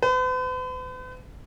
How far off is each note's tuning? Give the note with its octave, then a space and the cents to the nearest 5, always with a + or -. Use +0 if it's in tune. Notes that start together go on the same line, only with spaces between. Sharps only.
B4 +45